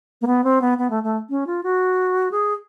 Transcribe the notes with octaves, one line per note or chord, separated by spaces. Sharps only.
A#3
B3
C4
B3
B3
A3
A3
C#4
F4
F#4
G#4